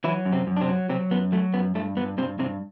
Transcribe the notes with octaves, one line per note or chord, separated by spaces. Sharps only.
E3 F#3 E4
F#2
C3 C4
F#2
D4
C3 C4
F#3
C3 F#3 C4
F#2 B3
F#3 A3
F#2 B3
G2 A3
G2 B3
G2 C3 C4
G2 C3 C4